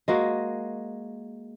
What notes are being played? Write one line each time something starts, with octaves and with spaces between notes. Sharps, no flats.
G#3 A#3 F#4